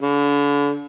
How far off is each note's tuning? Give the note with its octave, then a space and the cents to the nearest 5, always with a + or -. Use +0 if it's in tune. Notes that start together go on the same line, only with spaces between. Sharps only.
D3 -40